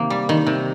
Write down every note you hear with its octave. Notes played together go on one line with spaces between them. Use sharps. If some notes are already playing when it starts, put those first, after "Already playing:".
Already playing: C3 D#3 A#3
G3
D#3
C3